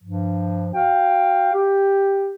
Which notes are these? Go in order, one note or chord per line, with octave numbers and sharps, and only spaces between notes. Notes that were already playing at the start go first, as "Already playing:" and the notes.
G2 F3
F#4 F5 G5
G4